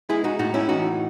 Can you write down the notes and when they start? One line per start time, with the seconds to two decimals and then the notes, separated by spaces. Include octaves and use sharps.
0.09 G#3 E4 G#4
0.24 D#4 F#4
0.39 A2 D#4 F#4
0.54 C#4 E4
0.69 E3 D#4 F#4